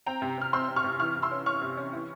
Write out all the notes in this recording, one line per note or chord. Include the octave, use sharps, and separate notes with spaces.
C4 G5 A#5
C3
C3 F6
C4 C6 E6
C4
C#6 F6
C3
E3 C#6 F6
C3
C6 E6
C#4
C#4 C#6 F6
C3
C#4
E3